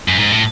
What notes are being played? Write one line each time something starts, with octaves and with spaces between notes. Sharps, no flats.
F#2
G#2
A2